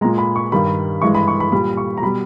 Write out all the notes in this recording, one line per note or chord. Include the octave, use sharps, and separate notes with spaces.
A#2 G#3 A#5
B5
C#6
G2 D#3 G3 B5
G2 E3 G#3 C#6
B5
C#6
B5
A#2 G3 B5
C#6
A#5
B2 G3 B5